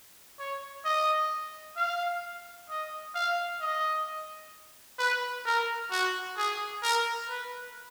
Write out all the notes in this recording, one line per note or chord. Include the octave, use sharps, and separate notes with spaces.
C#5
D#5
F5
D#5
F5
D#5
B4
A#4
F#4
G#4
A#4
B4